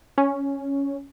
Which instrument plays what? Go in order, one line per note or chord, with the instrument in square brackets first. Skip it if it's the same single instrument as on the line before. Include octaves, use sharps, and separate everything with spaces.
[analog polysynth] C#4